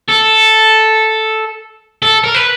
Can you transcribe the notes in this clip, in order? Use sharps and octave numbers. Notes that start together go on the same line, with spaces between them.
A4
A4
A#4
B4